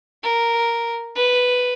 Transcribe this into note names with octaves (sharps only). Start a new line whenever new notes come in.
A#4
B4